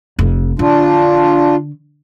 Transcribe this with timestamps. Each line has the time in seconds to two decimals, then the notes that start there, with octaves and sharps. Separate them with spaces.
0.19 F1 F2
0.59 D3 D4 F4